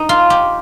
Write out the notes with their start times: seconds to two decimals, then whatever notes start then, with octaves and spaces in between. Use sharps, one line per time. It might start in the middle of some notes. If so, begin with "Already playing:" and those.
Already playing: D#4
0.09 F4
0.30 G4